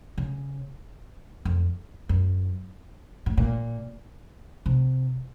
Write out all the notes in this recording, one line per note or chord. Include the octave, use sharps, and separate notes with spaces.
C#3
F2
F#2
A2
A#2
C3